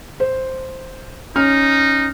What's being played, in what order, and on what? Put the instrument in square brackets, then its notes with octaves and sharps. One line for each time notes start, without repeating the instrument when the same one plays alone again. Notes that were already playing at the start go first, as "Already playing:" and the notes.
[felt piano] C5
[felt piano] C#4 F6 [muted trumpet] D#4